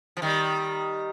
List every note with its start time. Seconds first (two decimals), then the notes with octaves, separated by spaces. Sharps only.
0.17 F3
0.22 D#3 G3